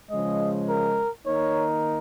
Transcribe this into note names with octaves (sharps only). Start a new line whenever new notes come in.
C#3 F3 G#3 D#5
A#4
D#3 A#3 D#4 A#4 C#5